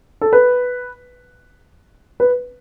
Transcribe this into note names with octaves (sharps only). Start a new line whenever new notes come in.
A4
B4
B4